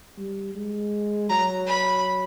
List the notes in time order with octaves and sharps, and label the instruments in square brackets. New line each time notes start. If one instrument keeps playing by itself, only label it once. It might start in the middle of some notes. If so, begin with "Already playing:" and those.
[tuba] G3
G#3
[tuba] F#3 [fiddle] A#5
[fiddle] B5